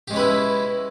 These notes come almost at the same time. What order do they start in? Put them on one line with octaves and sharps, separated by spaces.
G4 G#3 C#4 B4 E4